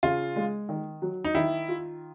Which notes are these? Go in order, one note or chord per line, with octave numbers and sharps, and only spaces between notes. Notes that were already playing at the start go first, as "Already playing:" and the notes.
C#3 F4
G#3
D#3
F#3
D#4
D#3 E4
F4